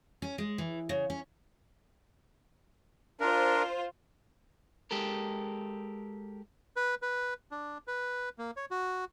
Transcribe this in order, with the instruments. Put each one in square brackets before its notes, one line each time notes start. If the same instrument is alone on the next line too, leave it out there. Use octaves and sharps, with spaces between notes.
[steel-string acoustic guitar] C#4
G#3
E3
C#3
C#4
[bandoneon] D4 A#4 [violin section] F4 C5
[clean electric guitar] G#3 G4 A4 A#4
[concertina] B4
B4
D4
B4
A#3
C#5
F#4